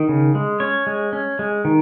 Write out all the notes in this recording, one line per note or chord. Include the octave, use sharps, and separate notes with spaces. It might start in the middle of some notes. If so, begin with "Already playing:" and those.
Already playing: D#3
C#3
G#3
C#4 C#5
G#3
C#4
G#3
D#3